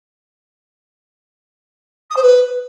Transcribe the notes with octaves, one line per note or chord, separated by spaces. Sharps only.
D#6
C5
B4